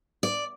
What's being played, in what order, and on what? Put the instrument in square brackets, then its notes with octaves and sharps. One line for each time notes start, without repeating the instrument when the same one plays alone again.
[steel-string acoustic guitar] D5